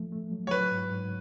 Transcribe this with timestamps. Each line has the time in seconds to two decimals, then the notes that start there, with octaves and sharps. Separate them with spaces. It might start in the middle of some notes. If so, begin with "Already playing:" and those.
Already playing: F3 A3
0.12 A3
0.32 F#3
0.47 C#5
0.51 F#3 B4
0.72 G#2
0.91 G#2